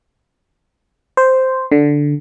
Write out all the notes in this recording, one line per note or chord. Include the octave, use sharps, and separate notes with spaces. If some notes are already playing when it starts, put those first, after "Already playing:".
C5
D3